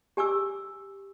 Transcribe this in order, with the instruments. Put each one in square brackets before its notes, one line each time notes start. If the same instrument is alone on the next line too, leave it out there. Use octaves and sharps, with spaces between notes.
[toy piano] G4 G#5 D6 E6